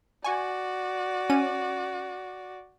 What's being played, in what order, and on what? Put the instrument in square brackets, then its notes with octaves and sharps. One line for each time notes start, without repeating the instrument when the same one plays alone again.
[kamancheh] F#4 D5 [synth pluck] G#5 C#6
[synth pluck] C#4 D#7